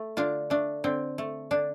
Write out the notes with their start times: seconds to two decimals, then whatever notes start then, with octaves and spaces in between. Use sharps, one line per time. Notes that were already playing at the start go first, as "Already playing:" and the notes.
Already playing: A3
0.17 D3 D4 F4
0.50 A3 D4
0.84 D3 C4
1.18 A3
1.51 D3 D4